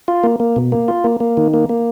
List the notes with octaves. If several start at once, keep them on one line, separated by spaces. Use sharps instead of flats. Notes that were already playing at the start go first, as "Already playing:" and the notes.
F4
A#3
A#3
B2
A#3
F4
A#3
A#3
D#3
A#3
A#3